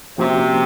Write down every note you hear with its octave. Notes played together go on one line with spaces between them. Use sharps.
C3 F3 A#3 C#4 F#4